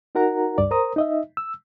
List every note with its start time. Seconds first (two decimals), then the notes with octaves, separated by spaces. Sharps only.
0.15 D#4 F#4 A#4 F#5 A#5
0.58 C#2 G2 D5
0.71 A#4 C5 A#5 D#6
0.96 D#4 D#5 E5
1.37 E6